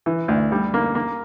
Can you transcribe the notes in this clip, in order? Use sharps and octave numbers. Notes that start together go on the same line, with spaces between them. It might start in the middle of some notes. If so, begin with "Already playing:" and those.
E3
D2
G3
A#3
A#3